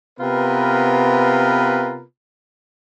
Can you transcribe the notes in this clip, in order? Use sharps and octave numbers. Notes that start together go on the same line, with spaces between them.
C3 B3 F4 A#4 B4